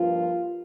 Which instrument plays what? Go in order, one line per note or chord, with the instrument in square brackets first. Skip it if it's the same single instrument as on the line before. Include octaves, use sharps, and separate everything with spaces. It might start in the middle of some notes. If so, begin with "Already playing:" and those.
Already playing: [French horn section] G2 F3 A#3 F4